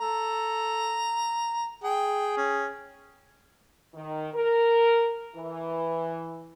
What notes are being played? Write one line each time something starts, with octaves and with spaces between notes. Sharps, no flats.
A4 A#5
G#4 G5
C#4
D#3
A#4
E3